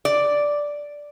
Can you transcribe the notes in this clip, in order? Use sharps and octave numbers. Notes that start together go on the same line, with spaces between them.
D5